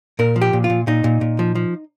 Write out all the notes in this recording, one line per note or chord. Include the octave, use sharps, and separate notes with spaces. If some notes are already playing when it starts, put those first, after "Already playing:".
A#2 A#4
F3
G4
A#2
F4
A#2
A#2 D#4
A#2
A#2
F3
F3